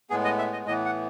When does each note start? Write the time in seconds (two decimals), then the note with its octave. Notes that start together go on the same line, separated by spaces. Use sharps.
0.10 A2 G#3 B3 G#4
0.25 D#5
0.38 E5
0.53 D#5
0.66 A2 E3 B3 D#5
0.85 F#5